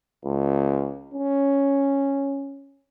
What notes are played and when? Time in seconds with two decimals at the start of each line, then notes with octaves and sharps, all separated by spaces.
0.25 C#2
1.14 C#4